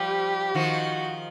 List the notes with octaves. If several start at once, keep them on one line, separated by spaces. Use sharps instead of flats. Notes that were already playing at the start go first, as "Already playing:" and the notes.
Already playing: F3 G3 G4
D#3 F3 F#4